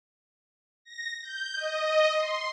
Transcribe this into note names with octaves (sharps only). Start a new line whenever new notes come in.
A#6
G6
D#5
C6